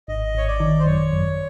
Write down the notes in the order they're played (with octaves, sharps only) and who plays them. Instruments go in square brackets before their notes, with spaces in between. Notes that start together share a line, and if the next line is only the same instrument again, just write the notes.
[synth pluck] G#1 [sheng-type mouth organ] D#5
[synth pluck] G#1 [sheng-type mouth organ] C#5
[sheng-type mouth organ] D5
[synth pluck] D#3
[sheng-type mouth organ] C5
[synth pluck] F#2 [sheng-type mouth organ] C#5
[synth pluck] F#2